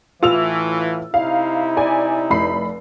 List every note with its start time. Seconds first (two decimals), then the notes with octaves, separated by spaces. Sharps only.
0.23 A2 E3 F4 E6 F7
1.14 C3 D#4 E4 F5
1.77 D5 G#5
2.30 F1 B5 C7